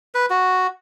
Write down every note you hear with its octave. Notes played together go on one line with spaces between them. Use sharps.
B4
F#4